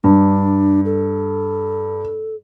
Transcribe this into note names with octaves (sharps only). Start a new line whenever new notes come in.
G2 D4
A4